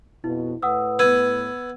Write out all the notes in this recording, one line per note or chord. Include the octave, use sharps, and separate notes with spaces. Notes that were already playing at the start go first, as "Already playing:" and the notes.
F2 B2 E4
A2 B4 F#5 D#6 E6
B3 E6 G#6 D#7